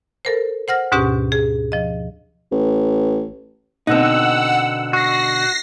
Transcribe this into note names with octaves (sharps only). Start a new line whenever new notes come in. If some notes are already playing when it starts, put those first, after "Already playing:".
A4 A#4 C5
C5 F#5 F6 A#6
D2 G#2 B2 C#4 G4
G#4
F3 D#5
A1
B2 D3 C4 D#4 F#5 E6
F#4 A#6 C7